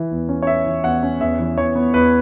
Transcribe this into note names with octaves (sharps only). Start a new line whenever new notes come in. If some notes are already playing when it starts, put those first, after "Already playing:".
Already playing: E3 E4
E2
C#4
C#5
E4 E5
E3
E2 F#5
C#4
E2 E5
E3
E2 C#5
B3
E2 B4